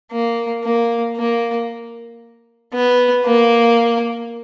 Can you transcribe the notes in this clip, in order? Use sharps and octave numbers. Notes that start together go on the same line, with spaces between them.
A#3
A#3
A#3
B3
A#3